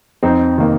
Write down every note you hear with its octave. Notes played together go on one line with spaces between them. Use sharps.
F2 C4 D#4
C3 D#3 A#3